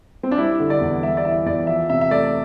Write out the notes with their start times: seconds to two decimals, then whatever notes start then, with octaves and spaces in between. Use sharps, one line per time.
0.23 C4
0.31 D4
0.38 G3 E4
0.59 D3
0.70 D5
0.81 E2
1.03 G3 E5
1.17 D5
1.25 E3 E5
1.46 E2 D5
1.67 F3 E5
1.90 C3 E5
2.01 E5
2.11 A3 D5